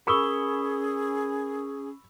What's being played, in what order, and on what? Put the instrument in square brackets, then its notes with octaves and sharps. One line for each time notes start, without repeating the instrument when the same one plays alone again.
[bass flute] C#4 [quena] G#4 [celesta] A#4 D#6 G7 [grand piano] B5 C#6 E6